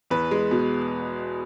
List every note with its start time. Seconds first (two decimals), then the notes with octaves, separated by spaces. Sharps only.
0.10 E2 B4
0.31 G#3
0.51 B2